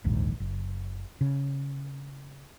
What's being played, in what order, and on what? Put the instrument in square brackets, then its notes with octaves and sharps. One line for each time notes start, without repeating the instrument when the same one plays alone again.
[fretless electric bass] D1 A#1 D#2 G#2
F#1
C#3